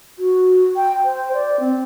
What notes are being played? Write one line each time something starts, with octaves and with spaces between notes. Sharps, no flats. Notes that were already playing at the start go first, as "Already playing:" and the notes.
F#4
G5
C5
D5
C4